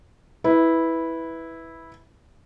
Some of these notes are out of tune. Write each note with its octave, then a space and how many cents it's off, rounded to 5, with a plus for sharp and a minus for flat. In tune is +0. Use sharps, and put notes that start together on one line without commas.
E4 -10 B4 +0